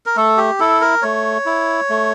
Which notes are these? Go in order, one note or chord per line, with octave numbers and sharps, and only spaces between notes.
A#4
A3 A4
G4
E4 A4
A#4
A3 C#5
E4
A3